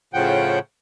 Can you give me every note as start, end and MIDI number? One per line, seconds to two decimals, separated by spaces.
0.14 0.59 45
0.14 0.59 49
0.14 0.59 53
0.14 0.59 78
0.14 0.59 79